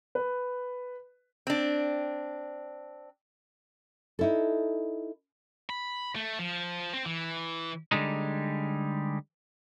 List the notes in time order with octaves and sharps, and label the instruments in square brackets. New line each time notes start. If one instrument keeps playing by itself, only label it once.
[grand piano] B4
[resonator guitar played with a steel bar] C4 D4
[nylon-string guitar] D#4 E4 A4
[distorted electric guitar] B5
A3
F3
C4
E3
[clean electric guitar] D3 G3 G#3 D#4